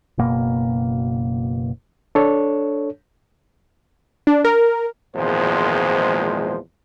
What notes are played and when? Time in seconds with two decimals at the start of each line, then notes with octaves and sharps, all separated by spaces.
0.18 F#1 B2 A#3
2.15 D4 A4 C#5
4.27 D4
4.44 A#4
5.16 G#1 E2 A#2 F3 G#3 C5